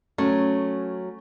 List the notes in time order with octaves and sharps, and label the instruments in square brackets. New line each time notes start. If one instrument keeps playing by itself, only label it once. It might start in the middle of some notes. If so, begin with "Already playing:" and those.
[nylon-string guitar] F#3 [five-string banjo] A3 [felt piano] C#4